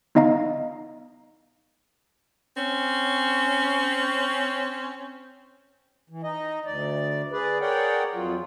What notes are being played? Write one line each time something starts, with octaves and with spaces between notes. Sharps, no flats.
B3 D#4 D#5 F5 A#5
C4 C#4
E3
D#4 D#5
D2 D5
G#4 B4 D5
G#4 A#4 C#5 D5 F#5 G5
F2 F#3 F4